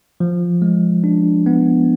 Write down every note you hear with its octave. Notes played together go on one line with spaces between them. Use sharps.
F3
G#3
D4
B3